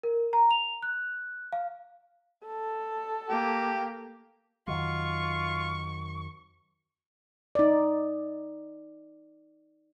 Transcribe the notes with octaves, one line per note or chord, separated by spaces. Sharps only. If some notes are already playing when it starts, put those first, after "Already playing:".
A#4
A#5
F7
F#6
F5
A4
A#3 G4
F2 D#3 F#3 F4 C#6
D#4 D5